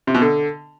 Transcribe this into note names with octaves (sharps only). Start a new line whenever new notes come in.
C3
B2
D3